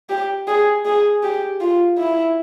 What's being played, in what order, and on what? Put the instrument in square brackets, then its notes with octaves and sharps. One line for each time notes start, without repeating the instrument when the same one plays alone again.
[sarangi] G4
G#4
G#4
G4
F4
E4